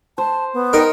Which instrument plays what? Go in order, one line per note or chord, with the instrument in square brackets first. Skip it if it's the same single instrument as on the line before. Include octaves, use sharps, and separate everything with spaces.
[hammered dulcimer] C5 [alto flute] A5
[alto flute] B3
[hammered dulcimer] D#4 [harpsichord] G4 A#4